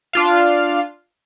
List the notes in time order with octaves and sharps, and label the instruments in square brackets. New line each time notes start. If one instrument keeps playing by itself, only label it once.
[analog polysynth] D4 F4 F5